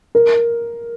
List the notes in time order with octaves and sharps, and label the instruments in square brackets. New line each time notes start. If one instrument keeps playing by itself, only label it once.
[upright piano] A#4